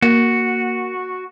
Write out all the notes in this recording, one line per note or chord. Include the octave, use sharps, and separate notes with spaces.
A#3 F#4